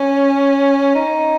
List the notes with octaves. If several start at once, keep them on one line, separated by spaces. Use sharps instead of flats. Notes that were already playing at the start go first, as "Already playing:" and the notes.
Already playing: C#4
D#4